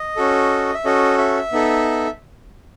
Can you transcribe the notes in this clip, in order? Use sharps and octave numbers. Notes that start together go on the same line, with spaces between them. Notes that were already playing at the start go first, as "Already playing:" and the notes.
Already playing: D#5
C#4 F#4 A4
E5
C#4 F#4 A4 D#5
E5
B3 D#4 A4